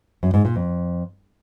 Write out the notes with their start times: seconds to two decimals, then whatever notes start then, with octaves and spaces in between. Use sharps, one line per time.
0.23 F#2
0.34 G#2
0.45 A#2
0.56 F2